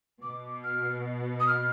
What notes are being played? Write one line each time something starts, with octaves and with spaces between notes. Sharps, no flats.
B2 D6
F6
D#6
F6